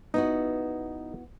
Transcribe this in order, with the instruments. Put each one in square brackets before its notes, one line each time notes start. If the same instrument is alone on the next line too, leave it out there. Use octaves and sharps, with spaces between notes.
[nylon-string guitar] B3 E4 F#4 [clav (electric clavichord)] D#4